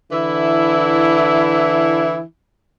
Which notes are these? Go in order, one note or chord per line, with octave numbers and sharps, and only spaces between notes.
D3 E3 E4